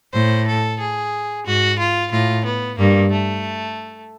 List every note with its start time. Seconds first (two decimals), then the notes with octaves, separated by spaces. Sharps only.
0.13 A2 C5
0.48 A4
0.80 G#4
1.46 G#2 F#4
1.79 F4
2.12 A2 F4
2.46 B3
2.78 G2 A#3
3.12 A3